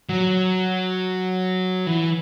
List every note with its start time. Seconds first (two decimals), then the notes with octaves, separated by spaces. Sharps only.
0.09 F#3
1.87 E3